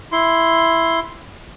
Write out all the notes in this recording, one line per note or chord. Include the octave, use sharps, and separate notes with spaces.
E4 C6